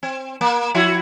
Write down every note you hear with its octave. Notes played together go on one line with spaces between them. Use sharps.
C4
A#3
F3 E4 F#4